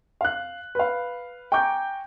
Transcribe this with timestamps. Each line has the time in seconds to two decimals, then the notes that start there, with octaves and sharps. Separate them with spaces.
0.21 F5 F#6
0.75 B4 F5
1.52 G5 G#5 A#5 C#6 D6 G6